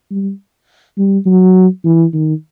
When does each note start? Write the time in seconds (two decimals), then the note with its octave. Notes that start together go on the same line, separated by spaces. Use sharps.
0.11 G3
0.98 G3
1.26 F#3
1.84 E3
2.13 D#3